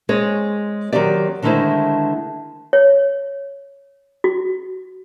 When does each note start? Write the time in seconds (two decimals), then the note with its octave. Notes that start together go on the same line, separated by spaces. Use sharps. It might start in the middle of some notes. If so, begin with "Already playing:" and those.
0.09 G#3 C4 G#4 C#5
0.93 D#3 F#3 C4 G4 D5
1.42 D3 D#3 G#3 A3 E4 C5
2.73 C#5
4.24 F#4